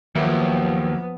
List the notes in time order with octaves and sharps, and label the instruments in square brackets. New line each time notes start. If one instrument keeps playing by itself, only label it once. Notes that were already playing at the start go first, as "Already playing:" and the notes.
[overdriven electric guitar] D#2 [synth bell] D#3 [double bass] F3 B3 [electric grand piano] F#3 A#3 E5